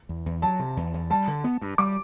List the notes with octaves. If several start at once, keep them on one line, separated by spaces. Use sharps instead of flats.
E2
E2
F#3 A5
C3
E2
E2
G3 A5
D3
B3
G2
G3 D6